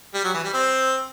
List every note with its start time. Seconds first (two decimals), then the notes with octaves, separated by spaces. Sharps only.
0.14 G3
0.24 F#3
0.34 E3
0.44 G3
0.54 C4